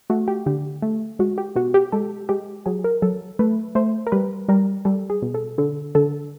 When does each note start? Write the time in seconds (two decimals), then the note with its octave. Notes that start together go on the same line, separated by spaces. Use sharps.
0.10 A3 F#4
0.28 G4
0.46 D3 G4
0.82 A3
1.19 G#3 F#4
1.38 G4
1.55 B2 F#4
1.74 G4
1.92 G#3 A4
2.29 G#3 G4
2.66 F#3 G#4
2.84 A#4
3.02 F#3 A4
3.39 A3 B4
3.75 A3 C5
4.07 A#4
4.12 G3 B4
4.49 G3 A#4
4.85 G3 A4
5.10 G#4
5.22 B2
5.34 A4
5.58 D3 A4
5.95 D3 A4